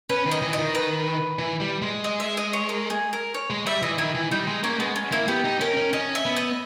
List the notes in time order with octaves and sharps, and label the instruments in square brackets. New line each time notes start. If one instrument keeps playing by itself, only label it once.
[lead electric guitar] C#4 [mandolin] B4
[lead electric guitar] D#3
[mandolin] D#5
[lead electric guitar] E3
[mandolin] D#5
[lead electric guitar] D#3
[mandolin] B4
[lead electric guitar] E3
G3
G#3
[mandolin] D#5
E5
D#5
C#5
A#4
G#4
A#4
C#5
[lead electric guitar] G#3
[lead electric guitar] G3 [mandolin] E5
[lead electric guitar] E3 [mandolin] D#5
[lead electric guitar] D#3 [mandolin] E4
[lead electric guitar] E3
[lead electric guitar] G3 [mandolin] D#4
[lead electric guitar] G#3
[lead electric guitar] A#3 [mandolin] C#4
[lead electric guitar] G#3 [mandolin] B3
[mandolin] C#4
[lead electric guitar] A#3 [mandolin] E4
[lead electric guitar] B3 [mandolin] G4
[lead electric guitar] D#4
[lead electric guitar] C#4 [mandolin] A#4
[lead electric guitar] C#4
[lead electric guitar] C#4 [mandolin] D#5
[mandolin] E5
[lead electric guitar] B3
[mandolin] D#5